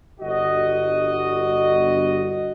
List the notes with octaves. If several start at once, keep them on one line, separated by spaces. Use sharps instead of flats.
G1 F#4 D#5